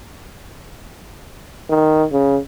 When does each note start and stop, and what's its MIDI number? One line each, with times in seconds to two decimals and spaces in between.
1.69 2.04 51
2.12 2.38 49